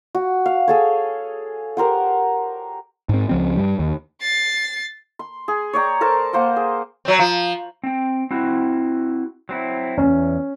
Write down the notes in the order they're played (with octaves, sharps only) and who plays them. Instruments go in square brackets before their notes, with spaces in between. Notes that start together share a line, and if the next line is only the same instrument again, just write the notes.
[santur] F#4
F5
G#4 A4 C#5
G4 A#4 C5 F#5
[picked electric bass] G#2 C4
C#2 F3 C4
G2 G3
D#2
[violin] A6 C7
[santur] C6
G#4
C#5 D5 G5 A#5
A4 A#4 C5 A5
A#3 C5 F#5 G5
G#4
[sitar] F#3 C4
F3
[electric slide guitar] C4 G5
C4 E4 F#4
F#3 C4 E4
[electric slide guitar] E2 [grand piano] C#4